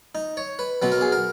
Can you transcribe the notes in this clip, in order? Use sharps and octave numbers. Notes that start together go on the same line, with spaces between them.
D#4
C#5
B4
B1 B2 F#3 B4
A#4
G#4
A#4